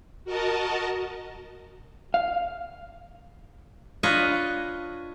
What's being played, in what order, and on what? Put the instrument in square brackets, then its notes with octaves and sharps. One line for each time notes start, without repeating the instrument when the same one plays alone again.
[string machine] F#4 A#4 D#5 A5
[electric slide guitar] F5
[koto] D4 F4 B4 C#5 D#5